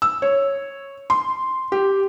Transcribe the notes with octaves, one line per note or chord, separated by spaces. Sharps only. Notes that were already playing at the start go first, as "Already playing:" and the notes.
E6
C#5
C6
G4